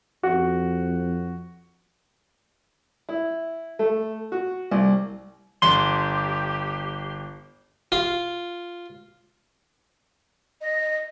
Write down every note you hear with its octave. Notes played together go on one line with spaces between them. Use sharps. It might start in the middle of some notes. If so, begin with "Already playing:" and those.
F2 F#4
E4
A3
F#4
C2
G1 G4 C6
F4
D#5